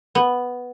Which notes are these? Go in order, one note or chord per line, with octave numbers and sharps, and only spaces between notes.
B3